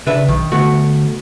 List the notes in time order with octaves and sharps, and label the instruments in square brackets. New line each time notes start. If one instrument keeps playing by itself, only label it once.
[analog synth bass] C#3 [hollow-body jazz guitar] D4 B4 E5
[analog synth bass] B1 [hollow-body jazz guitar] D#3
[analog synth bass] D3 [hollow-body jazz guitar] A3 B3 F#4